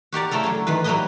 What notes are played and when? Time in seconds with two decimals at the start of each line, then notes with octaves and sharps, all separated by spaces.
0.13 F#4 G4 A#4 D5
0.31 C#3 A3 E4 A4 A#4
0.44 D3 F#3 C#4
0.67 D#3 E3 F4 B4
0.84 F#3 G3 A#3 E4 B4 D#5